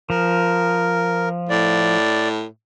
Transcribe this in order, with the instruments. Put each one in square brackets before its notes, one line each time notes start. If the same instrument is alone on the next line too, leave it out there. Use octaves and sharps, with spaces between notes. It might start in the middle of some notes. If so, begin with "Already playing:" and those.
[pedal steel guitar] F3 [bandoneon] A#4
[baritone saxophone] A2 [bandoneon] D5